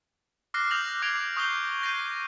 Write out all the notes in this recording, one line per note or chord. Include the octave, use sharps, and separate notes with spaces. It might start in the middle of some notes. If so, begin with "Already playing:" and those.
D6 F6 F#6 A#6 C7
D#6 F6 G6 A#6 F7 F#7
D6 F6 G#6 C7 D7 F7
C#6 D#6 G6 C7 F7 G7
G6 A#6 C7 D#7